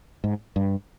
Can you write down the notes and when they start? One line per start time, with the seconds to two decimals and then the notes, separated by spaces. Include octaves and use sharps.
0.24 G#2
0.56 G2